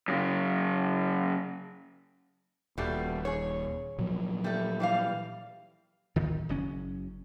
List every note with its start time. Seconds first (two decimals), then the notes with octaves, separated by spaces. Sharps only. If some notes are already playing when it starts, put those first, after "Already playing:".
0.08 F#2 C#3
2.78 D#1 B2 G3 A3
3.25 G#4 C#5
3.98 A#2 F3 F#3
4.44 G3 A3
4.80 E3 G3 F5
6.16 D1 G#1 A#2 D#3
6.49 F#1 F#3 C#4